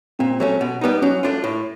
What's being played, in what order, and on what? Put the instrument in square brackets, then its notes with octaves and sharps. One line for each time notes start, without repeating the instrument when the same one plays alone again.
[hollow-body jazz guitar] A#2 [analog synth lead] C4
[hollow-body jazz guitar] F#3 A3 C#4
B2
G3 B3 D#4
[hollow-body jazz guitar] F#3 [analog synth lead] C#4
[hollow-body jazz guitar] A3 D4 F4
A2